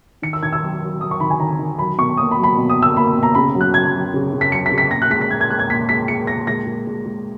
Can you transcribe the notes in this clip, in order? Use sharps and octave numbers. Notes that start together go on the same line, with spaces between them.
D#3 C#7
E6
D#3 G#6
E6
F#3
F#3
F#3 D#6
C#6
D#3 B5
G#5
D#3 A#5
D#3
F#3 B5
B2 C#6
A#3 D#6
B5
F#3
B5
B2
D#6
B2
E6
A#3 B5
B2
A#5
C#3 B5
F#3
F#6
F#3 G#6
F#3
C#3
C#3
B6
F#3 C#7
B6
C#3
B6
A#2 A#6
F#6
G#3 B6
B6
A#2 G#6
G#6
G#3 F#6
G#6
A#2 B6
G#3 B6
G#3 C#7
A#2 A#6
G#3 A#6
G#3
G#3
G#3